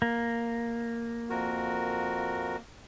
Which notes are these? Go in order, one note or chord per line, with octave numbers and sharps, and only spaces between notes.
A#3
F2 F#4 A#4